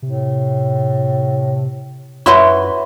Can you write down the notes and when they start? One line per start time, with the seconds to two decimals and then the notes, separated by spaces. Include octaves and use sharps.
0.02 A2 C3
2.26 F#2 E4 F#4 B4 C#5 C6 C#6